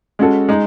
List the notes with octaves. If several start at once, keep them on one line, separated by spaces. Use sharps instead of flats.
G#3 C#4 F#4 A4
G#3 D#4